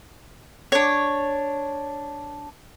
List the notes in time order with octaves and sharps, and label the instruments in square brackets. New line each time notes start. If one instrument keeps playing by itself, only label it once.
[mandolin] D4 C#5